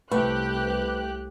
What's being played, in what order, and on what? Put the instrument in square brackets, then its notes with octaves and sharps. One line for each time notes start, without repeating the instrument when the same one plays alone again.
[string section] C2 G4 F#6 [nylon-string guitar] A3 [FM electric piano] B4